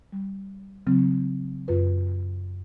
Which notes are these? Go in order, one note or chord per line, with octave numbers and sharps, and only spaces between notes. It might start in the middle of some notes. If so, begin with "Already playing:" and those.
G3
C#3 F#3 C4
F#2 F4 B4